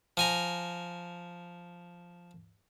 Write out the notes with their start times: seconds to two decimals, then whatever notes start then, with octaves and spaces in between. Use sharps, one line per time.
0.17 F3 G#5 A#5